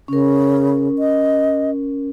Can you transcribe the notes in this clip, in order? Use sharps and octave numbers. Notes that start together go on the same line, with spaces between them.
C#3 C#4 A#4
D#5